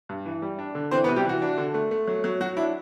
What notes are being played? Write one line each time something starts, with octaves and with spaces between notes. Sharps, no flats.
G2
E3
G3
D4
D3
E3 C4 C5
B3 B4
C3
G3 G4
E3 F#4
D4
D3
A3
A3
F#3
F#3
F#3 F#4
D4 E4